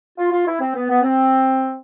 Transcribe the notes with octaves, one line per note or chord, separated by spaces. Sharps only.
F4
F4
E4
C4
B3
B3
C4